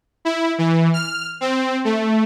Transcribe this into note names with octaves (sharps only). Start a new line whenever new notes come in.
E4
E3
F6
C4
A3